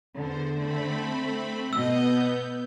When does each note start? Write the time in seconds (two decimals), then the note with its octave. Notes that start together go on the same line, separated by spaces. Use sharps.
0.16 E2 D3 C5
0.52 A3 C4 B5
1.73 B2 B3 D#5 E6 G6